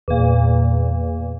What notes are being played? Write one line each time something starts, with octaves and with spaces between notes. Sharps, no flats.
E2 A#2